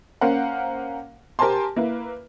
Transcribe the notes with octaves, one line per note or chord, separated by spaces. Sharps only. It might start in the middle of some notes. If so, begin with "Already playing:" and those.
A#3 C#4 A#4 C5 F5 F#5
G4 A#4 C5 G#5 A5 C6
A#3 E4 B4